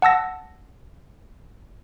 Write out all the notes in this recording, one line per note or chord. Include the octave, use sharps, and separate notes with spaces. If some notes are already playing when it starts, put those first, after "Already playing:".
F#5 A5 E6 A#6